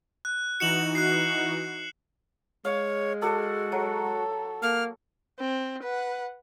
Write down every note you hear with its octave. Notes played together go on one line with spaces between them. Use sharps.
F#6
E3 D#4 F#4 C#7 E7 F#7
F#6 C7
G#3 C#5 F5
F#4 A4 D5
F#3 A4
A#3 F6
C4
B4 F#5